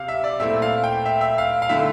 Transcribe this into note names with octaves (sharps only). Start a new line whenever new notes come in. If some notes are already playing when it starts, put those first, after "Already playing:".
Already playing: C3 F5
E5
D5
A#2 A3 C4 E4 E5
F5
G5
E5
E5
F5
F5
D3 A3 E4 E5